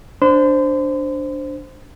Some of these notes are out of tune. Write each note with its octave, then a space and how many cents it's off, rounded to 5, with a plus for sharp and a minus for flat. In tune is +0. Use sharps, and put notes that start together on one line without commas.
D4 +0 C5 +0 C6 -40